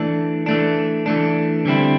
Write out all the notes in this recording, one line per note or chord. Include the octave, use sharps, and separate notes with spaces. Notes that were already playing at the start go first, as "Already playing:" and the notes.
Already playing: E3 A3 D4
E3 A3 D4
E3 A3 D4
D3 G3 C4 E4